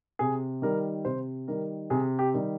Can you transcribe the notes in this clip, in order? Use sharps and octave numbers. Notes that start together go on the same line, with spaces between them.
C3 G#4
D#3 G3 A#4
C3 C5
D#3 G3 A#4
C3 G#4
G4
D#3 G3